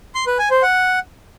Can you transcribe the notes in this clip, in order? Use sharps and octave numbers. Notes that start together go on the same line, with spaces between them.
C6
B4
G#5
C5
F#5